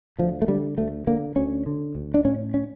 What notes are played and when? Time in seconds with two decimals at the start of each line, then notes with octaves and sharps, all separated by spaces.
0.19 D2 F3
0.42 A3
0.48 D3 G3
0.78 D2 A3
1.07 D3 A#3
1.36 D2 C#4
1.66 D3
1.95 D2
2.14 D4
2.25 A2 C#4
2.54 C#4